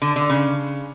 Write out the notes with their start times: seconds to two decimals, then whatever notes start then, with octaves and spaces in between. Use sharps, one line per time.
0.02 D3
0.16 D3
0.30 C#3